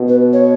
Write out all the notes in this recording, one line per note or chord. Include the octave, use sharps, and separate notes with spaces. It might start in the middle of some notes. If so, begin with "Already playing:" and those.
Already playing: B2
B4
C#5